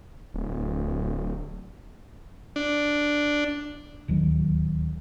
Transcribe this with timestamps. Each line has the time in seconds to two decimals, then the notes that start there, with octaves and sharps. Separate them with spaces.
0.34 D1
2.56 D4
4.08 D1 D#2 F#3